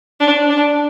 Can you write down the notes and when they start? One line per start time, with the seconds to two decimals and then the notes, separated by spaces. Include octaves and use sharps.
0.20 D4
0.50 D4